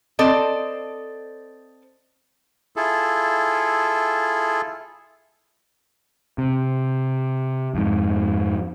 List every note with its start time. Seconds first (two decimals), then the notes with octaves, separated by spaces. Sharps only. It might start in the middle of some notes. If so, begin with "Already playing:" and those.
0.19 C4 A4 D5 D#5
2.76 E4 F4 G#4 A4
6.38 C3
7.75 F2 G#2